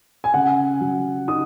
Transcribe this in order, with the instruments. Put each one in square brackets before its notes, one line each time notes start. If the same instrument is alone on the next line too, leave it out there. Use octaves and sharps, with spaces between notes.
[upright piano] G#5
C#3 F#5
F#3
D#4 D#6